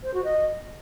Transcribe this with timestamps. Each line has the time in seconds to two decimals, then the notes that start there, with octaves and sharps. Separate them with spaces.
0.03 C5
0.14 F#4
0.24 D#5